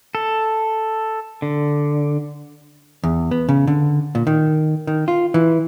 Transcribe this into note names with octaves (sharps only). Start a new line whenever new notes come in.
A4
D3
E2
B3
C#3
D3
A#2
D#3
D#3
F4
E3